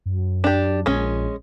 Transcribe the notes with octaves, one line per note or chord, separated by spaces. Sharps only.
F#2
D4 G4
A#1 G#3 C#4